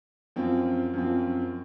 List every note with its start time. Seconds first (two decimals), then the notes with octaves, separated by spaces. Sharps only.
0.36 F#2 F3 C4
0.94 F#2 F3 C4